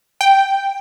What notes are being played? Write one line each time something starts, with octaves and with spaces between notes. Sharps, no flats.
G5